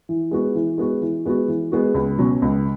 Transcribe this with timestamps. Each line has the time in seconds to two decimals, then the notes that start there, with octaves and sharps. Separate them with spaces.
0.09 E3
0.31 G#3 B3 F#4
0.55 E3
0.78 G#3 B3 F#4
1.01 E3
1.25 G#3 B3 F#4
1.48 E3
1.72 G#3 B3 F#4
1.94 C#2
2.18 B2 F#3 C#4
2.42 C#2